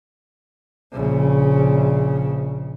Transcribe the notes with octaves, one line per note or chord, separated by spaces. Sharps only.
A#1 C#3